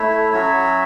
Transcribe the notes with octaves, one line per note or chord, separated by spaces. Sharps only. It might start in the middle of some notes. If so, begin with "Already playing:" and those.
Already playing: A3 E4 C#5 E5
F#3 C#4 F#4 C#5 E5